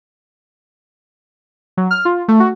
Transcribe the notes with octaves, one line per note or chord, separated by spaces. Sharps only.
F#3
F6
F4
A3
F#4